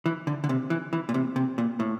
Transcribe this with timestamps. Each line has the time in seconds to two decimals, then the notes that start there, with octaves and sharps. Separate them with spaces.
0.06 E3
0.27 D3
0.44 D3
0.49 C3
0.70 E3
0.93 E3
1.09 A#2
1.14 C3
1.36 C3
1.58 A#2
1.80 A2